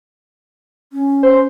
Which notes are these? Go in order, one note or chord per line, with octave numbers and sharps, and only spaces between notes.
C#4
C5